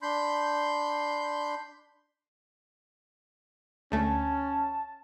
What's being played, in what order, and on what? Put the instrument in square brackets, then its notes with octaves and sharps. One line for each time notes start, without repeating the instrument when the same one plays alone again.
[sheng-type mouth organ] D4 B5 C6 G6
[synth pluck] D2 A3 [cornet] C#4 [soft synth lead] A5